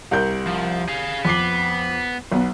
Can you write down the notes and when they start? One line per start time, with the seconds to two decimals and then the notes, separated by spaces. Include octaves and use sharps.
0.11 C2 A#4 G6
0.47 F3
0.88 G#4 F5
1.25 F2 B3 D6 C7
2.32 B1 B3